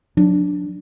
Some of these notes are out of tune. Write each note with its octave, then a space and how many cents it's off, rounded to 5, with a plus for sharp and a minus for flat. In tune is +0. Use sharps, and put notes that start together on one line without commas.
F#3 -35 D4 -5